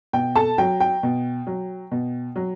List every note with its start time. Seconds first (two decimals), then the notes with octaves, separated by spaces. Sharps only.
0.13 B2 G5
0.35 A4 A5
0.58 F#3 G5
0.80 G5
1.03 B2
1.47 F#3
1.92 B2
2.36 F#3